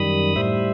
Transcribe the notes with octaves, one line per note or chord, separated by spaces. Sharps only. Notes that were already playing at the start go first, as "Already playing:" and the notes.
Already playing: F#2 D#3 G3 B5 D#6
A2 G3 C5 E5